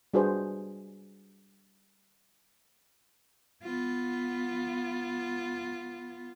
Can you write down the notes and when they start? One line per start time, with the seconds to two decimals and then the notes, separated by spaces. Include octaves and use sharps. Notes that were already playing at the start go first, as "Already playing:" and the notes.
0.14 G3 D4 F#4 G#4 B4 C5
3.63 B3 F4